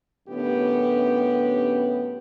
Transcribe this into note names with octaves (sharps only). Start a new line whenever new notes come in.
F#2 A2 D3 B3 C#4 G4